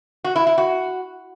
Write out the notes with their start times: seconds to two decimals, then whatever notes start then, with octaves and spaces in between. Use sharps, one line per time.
0.24 F#4
0.36 E4
0.47 E4
0.58 F#4